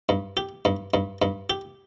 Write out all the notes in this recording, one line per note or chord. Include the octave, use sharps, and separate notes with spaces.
G2
G4
G2
G2
G2
G4